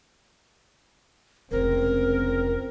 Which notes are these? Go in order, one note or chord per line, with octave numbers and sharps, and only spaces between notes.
F1 C#2 C3 C4 A#4